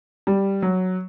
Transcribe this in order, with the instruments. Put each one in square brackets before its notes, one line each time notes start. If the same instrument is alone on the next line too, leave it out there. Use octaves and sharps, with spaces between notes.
[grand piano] G3
F#3